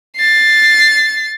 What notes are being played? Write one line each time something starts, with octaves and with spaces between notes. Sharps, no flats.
A6 C7